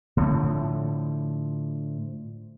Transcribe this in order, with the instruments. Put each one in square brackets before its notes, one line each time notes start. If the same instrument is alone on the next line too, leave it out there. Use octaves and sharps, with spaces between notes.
[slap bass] A2 D3 F3